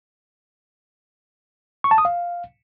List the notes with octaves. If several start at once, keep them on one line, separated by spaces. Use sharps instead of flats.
C#6
A5
D#6
F5